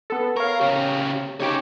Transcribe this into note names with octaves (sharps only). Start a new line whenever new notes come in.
B3 A4
A#4 C#5 F5
C#3 G4
C#3 D#4 G4 C#5 D6